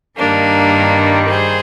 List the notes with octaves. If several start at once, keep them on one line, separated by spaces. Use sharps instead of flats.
G2 D#3 G3 A#3 D4
G#4 C5